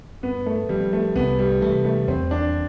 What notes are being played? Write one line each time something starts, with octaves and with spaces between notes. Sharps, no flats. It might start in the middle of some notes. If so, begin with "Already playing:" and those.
G2 B3
A3
F3 G3 C4
A3
C2 B3
G3
C3 E3 A3
A3
E2 C4
D4